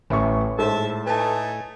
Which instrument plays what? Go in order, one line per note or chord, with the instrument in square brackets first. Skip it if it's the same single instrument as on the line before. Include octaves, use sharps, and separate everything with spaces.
[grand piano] A1 E5 C#6 [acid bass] A2
[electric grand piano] G#2 C5 [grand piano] A4 [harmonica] E5 A5
[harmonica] A3 D#4 G#5 [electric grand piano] B4 A5